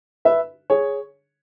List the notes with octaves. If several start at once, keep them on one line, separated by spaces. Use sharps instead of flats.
B4 E5
G#4 C#5